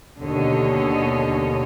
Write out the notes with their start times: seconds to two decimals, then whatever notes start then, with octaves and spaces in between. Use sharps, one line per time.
0.20 D#2 B2 D3 C#5 D#5